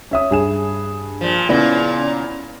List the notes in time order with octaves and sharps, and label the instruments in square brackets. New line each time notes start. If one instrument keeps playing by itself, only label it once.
[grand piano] C#4 E5 D#6
G2 G#4 E7
[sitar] A#2 F3
[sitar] A#2 C#3 [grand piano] B3 E4 D5